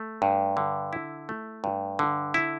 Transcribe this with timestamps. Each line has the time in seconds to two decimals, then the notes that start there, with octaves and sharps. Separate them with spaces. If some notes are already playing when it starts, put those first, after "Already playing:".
Already playing: A3
0.22 G2
0.57 D3
0.93 E4
1.29 A3
1.64 G2
1.99 D3
2.34 E4